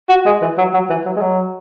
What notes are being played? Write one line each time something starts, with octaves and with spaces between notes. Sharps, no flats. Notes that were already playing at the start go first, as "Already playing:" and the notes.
F#4
G#3
E3
F#3
F#3
E3
F#3
G#3
F#3